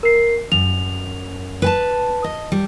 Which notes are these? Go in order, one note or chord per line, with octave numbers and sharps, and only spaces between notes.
A#4 C7
F#2 F7
B4 G#5 A5
D#5
G3